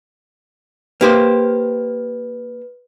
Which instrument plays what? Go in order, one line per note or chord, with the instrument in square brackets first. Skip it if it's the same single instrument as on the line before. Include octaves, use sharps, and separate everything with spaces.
[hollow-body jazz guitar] A#3 G4 C5 [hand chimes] B4